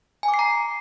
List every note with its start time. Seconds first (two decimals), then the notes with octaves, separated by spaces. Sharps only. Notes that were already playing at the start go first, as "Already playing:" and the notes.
0.23 G#5
0.28 D6
0.34 C7
0.39 A#5